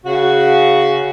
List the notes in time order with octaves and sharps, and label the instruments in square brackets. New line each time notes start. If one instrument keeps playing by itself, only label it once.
[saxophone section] C#3 F#4